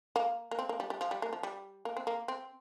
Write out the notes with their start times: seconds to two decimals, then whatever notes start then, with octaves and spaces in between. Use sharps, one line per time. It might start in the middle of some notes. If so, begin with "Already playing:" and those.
0.16 A#3
0.51 A#3
0.59 C4
0.69 A#3
0.80 G3
0.90 G3
1.01 F3
1.11 G3
1.22 A#3
1.33 F3
1.43 G3
1.85 A#3
1.97 C4
2.07 A#3
2.28 C4